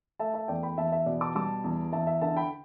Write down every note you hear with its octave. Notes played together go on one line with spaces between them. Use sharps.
A3 E5 A5
E5 A5
E2 D5 G5
G5 B5
E2 E5 A5
E5
B2 D5
A5 D6
G3 A5 D6
E2
E2 E5 A5
E5
D3 E5 A5
G5 B5